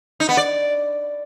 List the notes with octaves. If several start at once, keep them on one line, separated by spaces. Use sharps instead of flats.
D#4
B3
D5